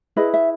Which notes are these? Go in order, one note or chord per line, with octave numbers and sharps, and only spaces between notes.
E4 G#4 B4 D#5
E5